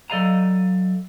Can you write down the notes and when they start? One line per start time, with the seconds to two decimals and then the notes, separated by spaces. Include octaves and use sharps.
0.10 F#3 A4 D5 D#5 F5 A#5